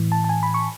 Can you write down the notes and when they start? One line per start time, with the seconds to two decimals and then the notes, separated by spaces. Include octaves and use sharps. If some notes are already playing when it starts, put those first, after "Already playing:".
Already playing: A2 E3
0.12 A5
0.24 A5
0.29 G#5
0.43 B5
0.54 C#6